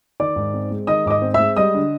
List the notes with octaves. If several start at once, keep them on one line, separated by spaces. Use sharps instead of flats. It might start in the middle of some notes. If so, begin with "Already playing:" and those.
D#3 D5 D6
G#2
C4
G#3
D#3 D#5 D#6
G#2 D#5 D6 D#6
C4
E5 E6
G#3
G3 D#5 D#6
D3